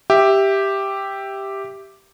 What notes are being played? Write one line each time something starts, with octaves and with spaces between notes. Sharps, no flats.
G4 E5